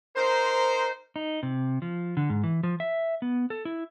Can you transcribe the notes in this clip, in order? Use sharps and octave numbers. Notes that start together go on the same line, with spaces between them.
D#4 A#4 C5
D#4
C3
F3
D3
G#2
E3
F3
E5
B3
A4
E4